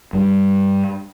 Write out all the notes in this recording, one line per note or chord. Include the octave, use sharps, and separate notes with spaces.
G2 G3